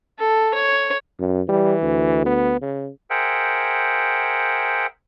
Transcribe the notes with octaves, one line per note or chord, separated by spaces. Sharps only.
A4
C#5
F#2
E3 G3
D2
B3
C#3
G#4 A#4 C5 E5 F#5 G5